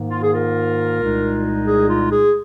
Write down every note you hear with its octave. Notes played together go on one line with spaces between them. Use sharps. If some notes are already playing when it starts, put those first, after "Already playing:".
Already playing: G#2 D#3 A#3
F4
G#4
F4 A#4
C2 A#2 G#3 D#4
G#4
F4
G#4